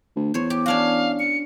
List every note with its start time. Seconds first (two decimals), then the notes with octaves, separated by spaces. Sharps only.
0.16 D2
0.34 E2 C5 C#5
0.50 G4
0.66 C#4 D4 F#4 F5
1.19 C#7